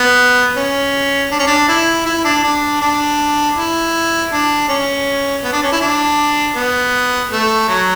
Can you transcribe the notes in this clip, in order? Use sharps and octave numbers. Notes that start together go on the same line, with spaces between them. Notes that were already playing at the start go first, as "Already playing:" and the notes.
Already playing: B3
C#4
D4
C#4
D4
E4
E4
D4
D4
D4
E4
D4
C#4
B3
D4
C#4
E4
D4
B3
A3
F#3